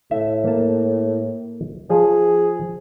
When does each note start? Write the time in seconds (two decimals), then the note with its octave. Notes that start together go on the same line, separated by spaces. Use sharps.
0.11 A2 E5
0.45 A#3 A5
1.90 F3 G#4